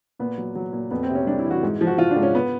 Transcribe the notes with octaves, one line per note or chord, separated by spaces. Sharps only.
A#2 B3
F#3
F#3
A#2
F2 B3
C4
C3
C#4
G3 D4
E4
E3
F#4
G#2
F3
F#4
F3 F4
D4
G#2
C#4
B3